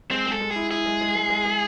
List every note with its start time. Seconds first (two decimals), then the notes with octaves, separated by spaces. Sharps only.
0.11 G#3 C4
0.26 G#3 A4
0.41 G#3
0.51 G#4
0.56 E4
0.71 E4 G#4
0.86 G#3
1.01 G#3
1.15 G#3
1.30 G#3
1.45 G#3